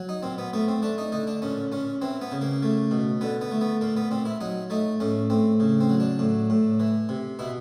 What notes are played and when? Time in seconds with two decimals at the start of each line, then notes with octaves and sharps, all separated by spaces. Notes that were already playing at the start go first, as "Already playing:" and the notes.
Already playing: F#3
0.09 D#4
0.23 A#2 C4
0.38 B3
0.53 A3 B3
0.68 C4
0.82 A3 D4
0.98 D#4
1.12 D3 D#4
1.27 D4
1.42 A#2 C#4
1.72 A#2 C#4
2.02 E3 C4
2.21 B3
2.32 C#3
2.41 A#3
2.62 A3
2.91 B2
3.21 D3 B3
3.41 B3
3.51 A3
3.61 B3
3.81 A#2 A#3
3.97 B3
4.11 A#2 C4
4.25 E4
4.41 F#3 D#4
4.70 A3 D#4
5.00 A2 C#4
5.30 A2 C4
5.60 C#3
5.81 C4
5.90 F#3
6.00 D4
6.19 A2
6.50 A2
6.80 E3
7.09 C3
7.39 B2 E4